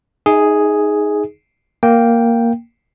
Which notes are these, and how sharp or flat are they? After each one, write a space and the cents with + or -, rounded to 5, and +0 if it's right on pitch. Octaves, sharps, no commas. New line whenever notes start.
D#4 +0 G#4 +0 E5 -40
A#3 +0 G5 +0